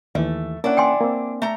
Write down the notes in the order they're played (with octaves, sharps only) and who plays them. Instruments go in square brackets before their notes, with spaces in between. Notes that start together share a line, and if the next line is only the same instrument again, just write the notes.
[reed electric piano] D#2 E3 [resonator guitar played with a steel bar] A3 [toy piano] E5
[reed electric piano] A#3 C#4 F#5 [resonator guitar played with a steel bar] D4 E4
[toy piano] G5 G#5 C6
[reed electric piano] A#3 C4
[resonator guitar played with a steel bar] A3 A#5